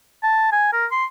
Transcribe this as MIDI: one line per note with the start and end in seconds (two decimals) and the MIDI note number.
0.23 0.47 81
0.52 0.71 80
0.72 0.86 70
0.92 1.05 84